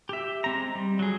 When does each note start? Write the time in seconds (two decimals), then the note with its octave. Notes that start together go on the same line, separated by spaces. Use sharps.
0.09 G4 E5
0.44 G#3 C4 A#5
0.75 G3
0.99 F#3 G#4